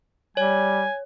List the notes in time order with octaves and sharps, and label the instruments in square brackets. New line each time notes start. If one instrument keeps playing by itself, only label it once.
[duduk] G3 [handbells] C#5 [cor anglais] G#5